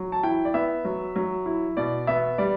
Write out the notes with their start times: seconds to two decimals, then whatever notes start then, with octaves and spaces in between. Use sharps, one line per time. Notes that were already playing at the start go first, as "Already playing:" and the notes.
Already playing: F#3
0.12 A5
0.23 E4 G5
0.45 D5
0.54 B3 E5
0.85 F#3
1.16 F#3
1.46 E4
1.77 B2 D5
2.07 B3 E5
2.38 G3 D5